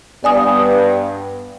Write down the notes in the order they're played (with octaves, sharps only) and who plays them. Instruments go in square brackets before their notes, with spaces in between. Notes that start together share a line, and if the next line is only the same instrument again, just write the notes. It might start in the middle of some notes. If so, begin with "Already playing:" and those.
[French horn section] G2 B3 [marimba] D5 G#5 D#6